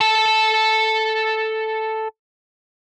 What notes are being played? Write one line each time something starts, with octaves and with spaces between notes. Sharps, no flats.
A4 A5